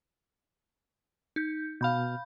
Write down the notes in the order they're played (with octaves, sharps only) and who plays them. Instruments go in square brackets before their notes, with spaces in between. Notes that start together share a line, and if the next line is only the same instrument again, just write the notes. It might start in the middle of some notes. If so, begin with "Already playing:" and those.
[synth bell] D#4 G6
[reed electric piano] B2 F6 [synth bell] F5 B5 G6